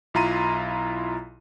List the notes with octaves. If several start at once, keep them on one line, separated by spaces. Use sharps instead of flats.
B1 E4 F4 A#5 C6 D#7